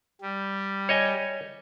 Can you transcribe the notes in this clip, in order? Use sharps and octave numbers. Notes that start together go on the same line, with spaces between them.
G3
C#5 D#5 G#5